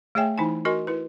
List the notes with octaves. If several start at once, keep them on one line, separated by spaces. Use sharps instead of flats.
A3 G#4 C#5 E5 G5 G#5
E3 D#4 E4 G#5
F#4 A#4 D#5 G#5 C6
E4 B4